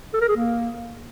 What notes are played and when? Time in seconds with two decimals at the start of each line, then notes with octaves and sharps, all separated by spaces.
0.13 A4
0.21 A#4
0.29 G#4
0.36 A#3